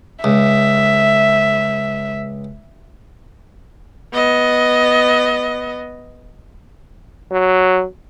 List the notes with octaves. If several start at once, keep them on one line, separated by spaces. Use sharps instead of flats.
C#2 E5
B3 D#5
F#3